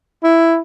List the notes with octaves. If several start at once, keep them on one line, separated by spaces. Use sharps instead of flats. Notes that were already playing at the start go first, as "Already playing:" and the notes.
E4